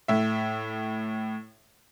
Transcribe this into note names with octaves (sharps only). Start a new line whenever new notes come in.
A2 E5